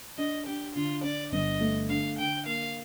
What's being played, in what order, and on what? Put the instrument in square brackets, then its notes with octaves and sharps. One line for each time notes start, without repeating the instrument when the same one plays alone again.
[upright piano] D4 [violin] D#5
[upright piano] D4 [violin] G4
[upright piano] D3 [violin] F4
[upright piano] D4 [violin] D5
[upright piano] G1 [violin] D#5
[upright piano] A3
[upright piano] D3 [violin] F5
[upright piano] D3 [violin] G5
[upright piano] A#3 [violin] F5